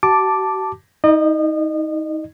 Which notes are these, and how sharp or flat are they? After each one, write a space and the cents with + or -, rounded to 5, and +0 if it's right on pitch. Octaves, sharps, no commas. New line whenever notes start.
F#4 +45 A5 +0 D6 +0
D#4 +30 D#5 -35